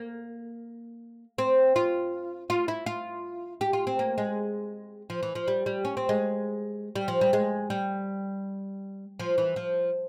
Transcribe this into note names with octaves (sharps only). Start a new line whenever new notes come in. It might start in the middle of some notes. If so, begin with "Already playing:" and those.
Already playing: A#3
C4
F4
F4
E4
F4
G4
F4
C4
A#3
G#3
F3
E3
F3
G3
G3
C#4
C4
G#3
G3
F3
G3
G#3
G3
F3
E3
F3